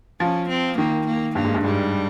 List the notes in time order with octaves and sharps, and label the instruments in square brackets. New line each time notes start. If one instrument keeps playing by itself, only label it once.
[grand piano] F3 [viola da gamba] C#4
[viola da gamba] C4
[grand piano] D#3 [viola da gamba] A#3
[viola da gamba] A#3
[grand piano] G2 [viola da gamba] A#3
[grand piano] G#2
G2
[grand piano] G#2 [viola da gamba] G3